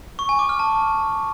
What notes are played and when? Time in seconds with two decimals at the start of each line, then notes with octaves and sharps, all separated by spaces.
0.19 C#6
0.29 G#5
0.39 D6
0.49 F6
0.59 A5